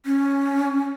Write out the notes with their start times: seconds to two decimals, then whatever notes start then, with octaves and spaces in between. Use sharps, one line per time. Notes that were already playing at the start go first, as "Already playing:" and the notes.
0.06 C#4